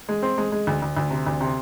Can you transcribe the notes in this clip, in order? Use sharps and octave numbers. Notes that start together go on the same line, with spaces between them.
G#3
C4
G#3
G#3
D2
D2
D2
C3
D2
C3